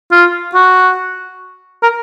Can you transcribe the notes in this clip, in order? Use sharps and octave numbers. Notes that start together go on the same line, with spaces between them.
F4
F#4
A#4